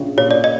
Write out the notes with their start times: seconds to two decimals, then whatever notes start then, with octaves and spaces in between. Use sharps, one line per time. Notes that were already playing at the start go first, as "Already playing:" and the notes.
Already playing: A#1 C#3
0.17 A#2 C#5
0.31 D5
0.44 D#5